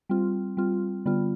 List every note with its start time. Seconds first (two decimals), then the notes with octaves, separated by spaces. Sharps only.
0.09 G3 C4 F4
0.57 G3 C4 F4
1.06 D3 G3 B3 F4